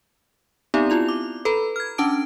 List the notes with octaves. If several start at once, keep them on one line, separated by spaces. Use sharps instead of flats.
B3 C4 D#4 G4 D5 A#5
E4 F4 F7
D6
A4 B4 A#5 B5
F6 G#6
C#4 D4 A5 D6 D7